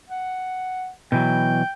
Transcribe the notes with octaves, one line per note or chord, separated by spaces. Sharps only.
F#5
B2 E3 F#3 G5